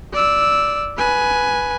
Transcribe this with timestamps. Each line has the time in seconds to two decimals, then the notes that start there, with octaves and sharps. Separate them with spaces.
0.13 D5 E6
0.98 B4 G#5